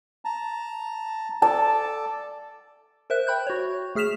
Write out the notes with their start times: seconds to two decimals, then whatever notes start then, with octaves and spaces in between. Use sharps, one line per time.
0.25 A5 A#5
1.42 A4 D5 A5
3.10 A#4 C5 E5 F#6
3.27 G5 B5 F#6 G6
3.47 F#4 C#5
3.95 A3 G#4 F6 B6 E7 F7